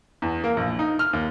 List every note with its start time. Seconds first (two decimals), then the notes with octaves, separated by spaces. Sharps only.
0.22 E2
0.44 A#3
0.57 A#1
0.79 D#4
0.99 F6
1.13 D#2